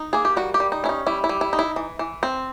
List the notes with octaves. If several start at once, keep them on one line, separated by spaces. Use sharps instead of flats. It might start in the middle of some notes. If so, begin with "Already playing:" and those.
Already playing: D#4
A#3 G#4
G4
G3 F#4
G4
G3
D#4
C#4 E4
D#4
G3 E4
E4
G3
E4
D#4
E4
E3
E3
C4